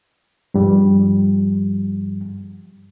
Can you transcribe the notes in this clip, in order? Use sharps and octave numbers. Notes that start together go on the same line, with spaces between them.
G2 F3 G3